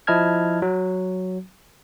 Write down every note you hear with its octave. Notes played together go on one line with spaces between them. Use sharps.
F3 E4 D#5 A5 F6 G#6
F#3